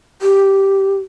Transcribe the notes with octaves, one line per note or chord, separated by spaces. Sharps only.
G4